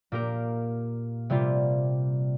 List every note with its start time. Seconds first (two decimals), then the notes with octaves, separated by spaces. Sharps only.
0.12 A#2 A#3 G4 A#4
1.30 C3 G3 A#3 F4